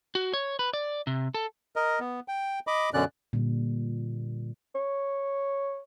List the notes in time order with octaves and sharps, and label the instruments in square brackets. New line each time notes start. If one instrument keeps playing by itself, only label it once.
[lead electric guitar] F#4
C#5
B4
D5
C3
A4
[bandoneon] A#4 D#5
B3
G5
D#5 B5 D6
F#2 B2 D3 C#4 D5 F#6
[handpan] A#2 D3 G3
[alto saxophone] C#5